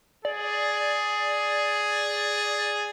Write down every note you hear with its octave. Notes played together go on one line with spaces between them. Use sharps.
G#4 D5